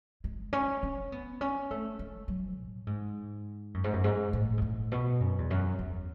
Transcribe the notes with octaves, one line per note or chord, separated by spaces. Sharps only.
G#3
C#4
C#4
B3
C#4
A3
G#3
F#3
A2
G#2
F#2
G#2
F#2
G#2
A2
G#2
A2
B2
F#2
E2
F#2
E2